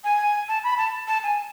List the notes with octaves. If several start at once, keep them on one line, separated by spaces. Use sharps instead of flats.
G#5
A5
B5
A5
A5
G#5